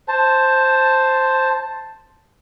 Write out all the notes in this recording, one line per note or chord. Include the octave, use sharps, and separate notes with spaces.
C5 A5